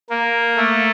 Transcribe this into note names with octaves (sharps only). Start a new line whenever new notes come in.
A#3
A3